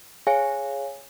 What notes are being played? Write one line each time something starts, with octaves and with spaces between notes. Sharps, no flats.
G#4 C#5 F5 G#5